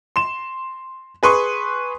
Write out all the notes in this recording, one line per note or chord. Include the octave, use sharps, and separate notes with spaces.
C6 E7
G#4 B4 C6 C#6